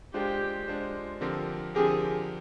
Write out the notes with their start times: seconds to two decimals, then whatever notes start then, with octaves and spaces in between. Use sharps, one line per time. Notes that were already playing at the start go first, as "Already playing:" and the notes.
0.14 G#3 D4 F4 G4 C5
0.68 G#3 D4 F4 C5
1.21 D3 F3 C4 G4 A#4
1.75 D3 F3 C4 G4 G#4 A#4